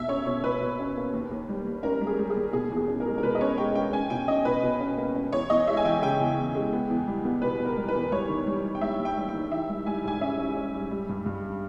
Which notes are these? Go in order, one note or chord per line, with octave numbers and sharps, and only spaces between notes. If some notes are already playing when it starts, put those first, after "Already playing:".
Already playing: B2 A#3 E5
C#4 C#5
B2 C#5
B2 B4
B2
C#4
A#3
D#2
D#2
G3
D#2
C#4 A#4
G3
G#4
G3
G#4
D#2
B2 G#4
E2
G#4
C#4
A#4
G#3
A#4
B2 B4
D#5
C#4 C#5
G#3 G5
C#4 G5
C#4 G#5
B2 G5
C#4 D#5
B2 B4
B2
C#4
A#3
C#4
E2 C#5
E2 D#5
G#3 E5
G#5
E3 G5
C#3 G5
E2
E2
G#3
B3
E2
G3
B3
B2 B4
B2
A#4
G3
B4
E2
G3 C#5
D#3
G3
G3
G5
G3 E5
D#2
G5
G3
G5
D#3
E3 E5
G3
G3 G#5
G#2 G#5
C#4 E5
C#4
C#4
G3
G3
G2
G2